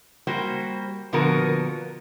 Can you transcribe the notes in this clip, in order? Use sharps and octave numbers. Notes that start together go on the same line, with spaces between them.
G3 A#3 F#4 C5
A#2 D3 F3 B3 F#4 A#4